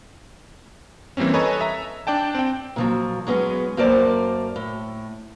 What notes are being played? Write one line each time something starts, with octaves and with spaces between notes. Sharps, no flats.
E3 G3 A#3 C4 C#4
A4 B4 C#5 D#5 G#5 A#5
E5 A#5
D4 D5 G5 A5
C4 G5
A#2 F3 F#3
F#3 G#3 B3 C#4 G#4
F#2 A#3 A#4 C5 D5 A5
A2